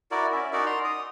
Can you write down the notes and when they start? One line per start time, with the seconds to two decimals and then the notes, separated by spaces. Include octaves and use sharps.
0.11 E4 F#4 A#4 D5
0.32 C#4 E5
0.53 D#4 F#4 A#4 D5
0.66 A#5 C6
0.84 D#6